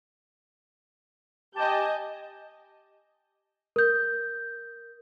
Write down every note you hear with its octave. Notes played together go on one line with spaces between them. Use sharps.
G4 D#5 G#5 A5 G6
A#4 G6